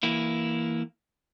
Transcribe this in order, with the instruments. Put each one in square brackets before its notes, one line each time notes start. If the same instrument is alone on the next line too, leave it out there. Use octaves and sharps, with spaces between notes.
[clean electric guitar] E3 A#3 E4